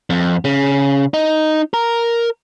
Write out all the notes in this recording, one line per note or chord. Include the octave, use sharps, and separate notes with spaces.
F2
C#3
D#4
A#4